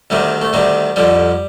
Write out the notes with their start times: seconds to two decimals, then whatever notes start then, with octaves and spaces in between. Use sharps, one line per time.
0.10 D2 C3 D#3 G3
0.42 A3
0.53 D2 C3 D#3 G3
0.96 F2 D3 F3 G3